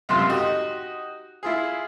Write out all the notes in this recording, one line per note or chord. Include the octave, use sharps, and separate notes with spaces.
C#2 F#2 C3 F4 C6
D#4 F#4 G4 D#5
E4 F4 G#4